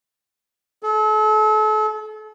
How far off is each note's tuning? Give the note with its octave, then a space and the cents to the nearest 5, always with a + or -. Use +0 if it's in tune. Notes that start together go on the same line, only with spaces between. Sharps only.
A4 -40